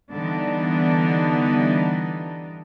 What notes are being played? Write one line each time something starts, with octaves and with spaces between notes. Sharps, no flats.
D3 E3 G3 B3 D4 D#4